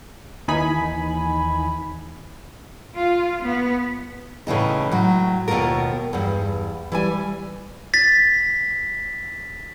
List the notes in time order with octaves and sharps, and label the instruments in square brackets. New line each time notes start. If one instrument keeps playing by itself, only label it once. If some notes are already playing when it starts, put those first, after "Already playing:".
[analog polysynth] D#2 E3 D#4 G#5 B5
[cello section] F4
B3
[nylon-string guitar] A2 C#3 E3 D#4
A2 F#3
D#2 B2 D#3 A3 F4 A#4
E2 G2
E3 G3 G#5
[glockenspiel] A6 B6